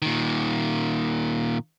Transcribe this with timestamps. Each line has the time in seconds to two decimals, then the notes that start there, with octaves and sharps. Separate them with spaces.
0.02 A#2 D#3